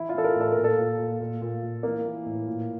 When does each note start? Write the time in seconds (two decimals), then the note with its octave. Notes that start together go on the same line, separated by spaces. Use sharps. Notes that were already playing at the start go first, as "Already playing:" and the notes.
Already playing: E3 E4
0.09 F4
0.14 E3 A4
0.24 A#4
0.36 A2
0.41 A4
0.52 A#2 A#4
0.64 A4
0.78 A#2
0.99 A#2
1.21 A#2
1.42 A#2
1.63 A#2
1.83 E3 A#3
2.05 E3
2.26 A2
2.47 A#2